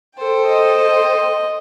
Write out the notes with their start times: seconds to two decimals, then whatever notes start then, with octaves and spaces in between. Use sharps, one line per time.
0.16 A4 C5 G5
0.46 D#5